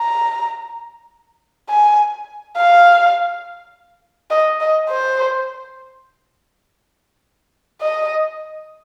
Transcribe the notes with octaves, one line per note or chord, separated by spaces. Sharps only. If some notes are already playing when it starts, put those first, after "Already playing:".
Already playing: A#5
G#5
F5
D#5
D#5
C5
D#5